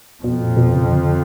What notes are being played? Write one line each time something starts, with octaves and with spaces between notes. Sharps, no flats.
F2 B2
A#2
B2
C#3
D3